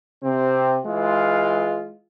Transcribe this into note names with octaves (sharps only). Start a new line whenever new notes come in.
C3 C4
E3 G#3 F4